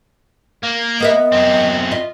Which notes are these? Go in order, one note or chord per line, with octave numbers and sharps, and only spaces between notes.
A#3
B3 A#4 D#5 E5
F#2 C4
F4 D#5 E5